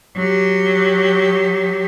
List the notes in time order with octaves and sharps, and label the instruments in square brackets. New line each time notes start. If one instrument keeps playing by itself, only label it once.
[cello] F#3 G4